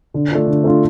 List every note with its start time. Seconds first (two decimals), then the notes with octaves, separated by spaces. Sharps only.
0.14 D3
0.30 A3 D4 F4
0.47 D3
0.64 A3 D4 F4